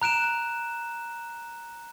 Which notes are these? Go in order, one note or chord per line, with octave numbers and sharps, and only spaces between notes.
A#5 F#6 D7 E7